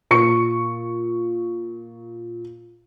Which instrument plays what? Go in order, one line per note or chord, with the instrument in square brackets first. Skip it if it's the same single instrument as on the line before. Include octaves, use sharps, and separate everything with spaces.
[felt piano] A#2 C#6 C#7